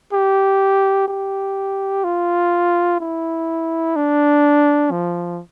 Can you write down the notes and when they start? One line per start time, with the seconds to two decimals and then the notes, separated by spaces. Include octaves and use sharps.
0.13 G4
1.08 G4
2.04 F4
3.00 E4
3.96 D4
4.91 F3